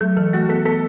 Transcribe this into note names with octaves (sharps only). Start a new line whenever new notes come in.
F#3 A3
E3 A4
A3 F#4
B3 A4
B3 A4